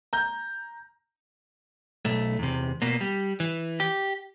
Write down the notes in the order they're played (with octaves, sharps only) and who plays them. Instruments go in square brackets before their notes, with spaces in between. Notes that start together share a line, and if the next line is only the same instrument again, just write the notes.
[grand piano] A#5 G6
[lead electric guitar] B1 A3
E2 C3
B2 A#3
G3
E3
G4